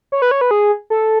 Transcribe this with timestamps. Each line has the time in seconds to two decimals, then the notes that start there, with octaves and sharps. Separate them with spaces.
0.12 C#5
0.22 B4
0.31 C#5
0.41 B4
0.51 G#4
0.90 A4